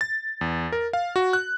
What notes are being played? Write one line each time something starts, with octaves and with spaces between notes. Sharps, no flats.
A6
E2
A#4
F5
F#4
F#6